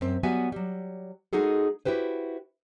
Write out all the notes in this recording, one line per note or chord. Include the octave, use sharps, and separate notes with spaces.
F#2 C4
F#3 G3 B3 F#4 E5 G#5
F#3 G3
G#3 D#4 F#4 G#4 A4
E4 F#4 G4 B4 C5